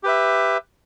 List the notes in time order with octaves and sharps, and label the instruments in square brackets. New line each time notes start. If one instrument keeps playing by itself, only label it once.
[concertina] G4 B4 E5